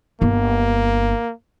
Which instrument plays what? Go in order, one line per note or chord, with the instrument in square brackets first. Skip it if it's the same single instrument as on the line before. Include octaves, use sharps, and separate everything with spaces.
[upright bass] G1 D4 [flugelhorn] A#3